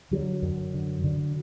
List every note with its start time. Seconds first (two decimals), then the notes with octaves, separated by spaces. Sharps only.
0.11 D3 F#3
0.42 F#2
0.74 D3
1.04 D3